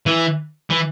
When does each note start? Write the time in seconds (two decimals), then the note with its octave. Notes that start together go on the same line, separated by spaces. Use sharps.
0.06 E3
0.70 E3